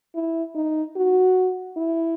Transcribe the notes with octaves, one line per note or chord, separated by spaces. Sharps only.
E4
D#4
F#4
E4